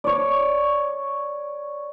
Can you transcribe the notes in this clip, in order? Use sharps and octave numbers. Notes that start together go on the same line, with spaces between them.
C#5 D5